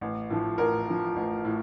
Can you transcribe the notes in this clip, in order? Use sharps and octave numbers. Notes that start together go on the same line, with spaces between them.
A1
A2 F3
A1 A#4
A2 F3
A1
A2